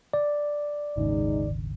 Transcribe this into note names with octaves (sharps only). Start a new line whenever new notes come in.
D5
D#1 G#1 C#3 G#3 D#4